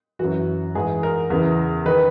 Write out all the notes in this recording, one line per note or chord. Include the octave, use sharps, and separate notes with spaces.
F#2 E3 F#4
G#2 E3 G#4
A#4
E2 C#3 E3
D#3 B4